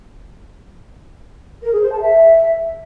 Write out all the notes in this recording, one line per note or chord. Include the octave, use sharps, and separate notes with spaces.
A#4
G#4
C5
A5
E5